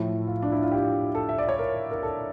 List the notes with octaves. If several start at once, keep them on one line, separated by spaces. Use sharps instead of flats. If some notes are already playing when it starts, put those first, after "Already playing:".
Already playing: A2 F3 E4
F4
D4
E4
F4
G4
A4
E5
D5
C#5
A#4
A#4
A4